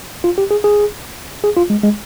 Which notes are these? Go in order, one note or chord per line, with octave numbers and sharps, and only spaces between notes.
F4
G4
G#4
G#4
G#4
F4
G#3
G#3